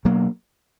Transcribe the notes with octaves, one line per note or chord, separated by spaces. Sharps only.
B2 F#3 A#3